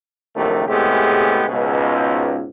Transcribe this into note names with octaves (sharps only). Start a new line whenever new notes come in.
A#1 D#2 C3 F#3 A3 A#4
A2 C3 G#3 B3 G4 G#4
C#2 G#2 B2